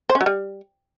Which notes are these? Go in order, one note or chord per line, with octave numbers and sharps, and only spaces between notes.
C5
C#4
F#3
G3